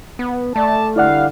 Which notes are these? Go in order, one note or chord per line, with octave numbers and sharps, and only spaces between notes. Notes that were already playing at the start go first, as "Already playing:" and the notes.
B3
A3 D5 A5
D3 G3 E4 D5 F5 F#5